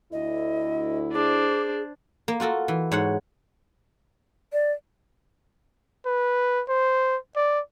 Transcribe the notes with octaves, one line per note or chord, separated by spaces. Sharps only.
D2 E4 D#5
D4 G#4 C5 D6
A#3
F4 F#4 A4 A#4
E3
G#2 C#5 F#5
D5
B4
C5
D5